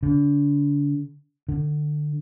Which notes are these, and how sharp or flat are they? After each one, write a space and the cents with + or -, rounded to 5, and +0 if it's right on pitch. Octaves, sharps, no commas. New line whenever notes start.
D3 -35
D3 +25